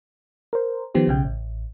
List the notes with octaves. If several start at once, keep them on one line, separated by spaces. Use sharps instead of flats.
A#4 C5
D#3 F3 B3 G4 C5
B1 C#3 G5
A1